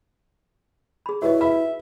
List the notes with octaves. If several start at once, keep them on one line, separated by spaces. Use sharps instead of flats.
G#4 B5
E4 F#4 G4 B4 C#5 D#5 E5
B4 E5 B5